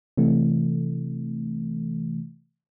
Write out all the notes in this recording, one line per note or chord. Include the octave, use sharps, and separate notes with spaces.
C3 E3 A3